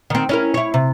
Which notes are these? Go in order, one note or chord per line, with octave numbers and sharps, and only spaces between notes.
D#3 C4
C#4 E4 A#4
E4 C#5
C3